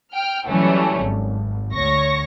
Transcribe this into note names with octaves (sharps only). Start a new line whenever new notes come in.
G5 F6
E3 F#3 G3 A3 C#4
G#1
D2 C#5 C#6 A#6